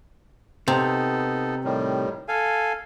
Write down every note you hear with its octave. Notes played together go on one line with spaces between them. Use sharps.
C3 B3 D#4 A4
A2 D#3 G3
A4 F5 G#5